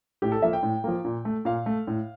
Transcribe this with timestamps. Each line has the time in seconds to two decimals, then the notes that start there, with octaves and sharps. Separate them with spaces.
0.22 A2 G4
0.32 A4
0.42 F3 A#3 E5
0.53 G5
0.63 A2
0.84 F3 A#3
1.05 A#2
1.25 A3
1.45 A#2 F5
1.66 A3
1.87 A2